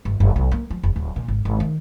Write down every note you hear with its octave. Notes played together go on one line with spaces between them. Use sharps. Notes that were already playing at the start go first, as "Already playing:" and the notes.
G1
F#1
B1
A#3
F3
F1
D1
A#2
G#1
G#1
D#3